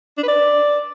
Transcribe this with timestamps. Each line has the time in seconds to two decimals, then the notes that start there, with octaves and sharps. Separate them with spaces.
0.18 D4
0.23 B4
0.28 D5